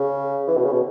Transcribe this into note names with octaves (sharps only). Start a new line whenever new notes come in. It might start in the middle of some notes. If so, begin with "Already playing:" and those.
Already playing: C#3
E3
B2
C#3
B2